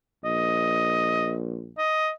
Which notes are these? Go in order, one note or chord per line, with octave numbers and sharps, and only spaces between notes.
A#1 D#5
D#5